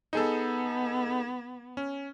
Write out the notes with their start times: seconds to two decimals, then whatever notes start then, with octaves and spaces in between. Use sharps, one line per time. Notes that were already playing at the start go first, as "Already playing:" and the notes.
0.13 B3 D#4 G#4 A4
1.77 C#4